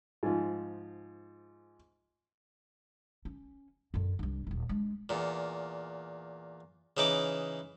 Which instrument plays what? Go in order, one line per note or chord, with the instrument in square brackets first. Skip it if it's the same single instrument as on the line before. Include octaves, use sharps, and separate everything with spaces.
[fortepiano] G#2 F3
[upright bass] C#4
F#2 D3
C2 D4
D#1 G#1
G#3 D4
[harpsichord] E2 A#2
C#3 E3 D#4 B4 D6